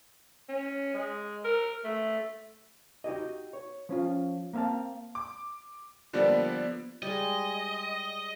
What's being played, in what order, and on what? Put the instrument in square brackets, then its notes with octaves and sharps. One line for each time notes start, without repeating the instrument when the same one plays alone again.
[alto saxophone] C#4
G#3
A#4
A3
[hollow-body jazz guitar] D#4 F#4 G4 D#5
C#5
F3 C#4 F4
A#3 C4 E5 F5 A5
[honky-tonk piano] D6
D3 F3 G3 A#3 B3 D4
[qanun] G3 G#3 [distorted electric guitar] D#5